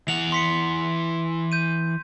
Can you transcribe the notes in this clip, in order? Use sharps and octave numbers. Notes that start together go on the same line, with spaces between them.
E3 F#5 F7
C6 B6 C#7
G6 D#7